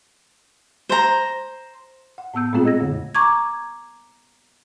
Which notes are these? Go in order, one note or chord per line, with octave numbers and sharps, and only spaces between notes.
C5 A#5
F#5
A2 B3 E6 G6
A#2 G#3 A3 C4 F4 G#4
D#5 E6 G#6 A#6
F2 D3
A#5 C#6 D6 G#6